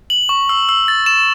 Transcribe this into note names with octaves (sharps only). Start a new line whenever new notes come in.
F#7
C#6
E6
E6
A6
E7